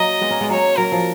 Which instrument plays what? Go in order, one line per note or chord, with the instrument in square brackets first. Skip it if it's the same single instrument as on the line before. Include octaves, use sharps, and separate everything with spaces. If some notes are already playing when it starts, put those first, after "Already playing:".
Already playing: [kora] F#3 A#3 [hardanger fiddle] D#5
[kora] G#3 B3
A#3 C#4
G#3 B3
[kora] F#3 A#3 [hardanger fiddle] C#5
[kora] F#3 [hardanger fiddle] A#4
[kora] F3